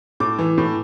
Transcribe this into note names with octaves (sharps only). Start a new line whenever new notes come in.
A2 D6
E3
A2